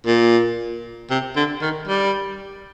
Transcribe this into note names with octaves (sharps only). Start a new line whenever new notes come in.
A#2
C3
D3
D#3
G3